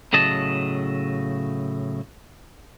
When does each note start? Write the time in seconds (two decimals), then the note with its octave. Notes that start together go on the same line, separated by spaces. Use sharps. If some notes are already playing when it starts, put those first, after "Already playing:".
0.13 A2 C#3 F#3 D#5 A5